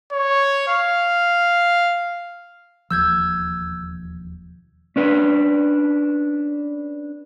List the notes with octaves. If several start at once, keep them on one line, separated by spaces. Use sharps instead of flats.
C#5
F5
E1 D#2 F3 E6 G6 G#6
C#4 D4 B4